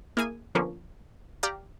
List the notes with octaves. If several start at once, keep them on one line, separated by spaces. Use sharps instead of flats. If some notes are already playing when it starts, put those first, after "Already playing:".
A#3 E4 G#4 G#5
D3 F3 A#3 B3 C#4 D4
G4 D5 F5 A#5